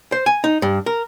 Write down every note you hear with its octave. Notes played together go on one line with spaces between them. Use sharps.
C5
G#5
D#4
G2
A#4